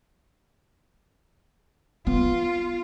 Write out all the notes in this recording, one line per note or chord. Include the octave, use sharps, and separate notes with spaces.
B3 F4